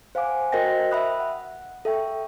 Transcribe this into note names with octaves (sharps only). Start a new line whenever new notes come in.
C5 F5 F#5 G#5 D6
F#4 A#4 C5 D#5 G5 A#6
E5 G5 B5 D#6 F#6
F#5
A4 E5 G5 C#6